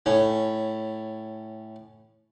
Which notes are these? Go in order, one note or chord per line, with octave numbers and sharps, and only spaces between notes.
A2 C#4